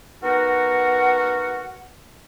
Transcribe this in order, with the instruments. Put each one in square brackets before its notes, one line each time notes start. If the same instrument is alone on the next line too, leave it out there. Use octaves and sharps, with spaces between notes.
[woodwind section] B3 D#4 F#4 A#4 F#5